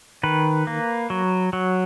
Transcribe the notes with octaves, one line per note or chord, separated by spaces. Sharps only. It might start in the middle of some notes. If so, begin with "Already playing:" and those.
D#3 B4
A#3
F#3
F#3